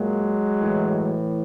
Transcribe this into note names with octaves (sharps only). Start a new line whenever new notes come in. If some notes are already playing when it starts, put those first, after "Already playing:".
Already playing: A#2 F#3 G#3
A2 E3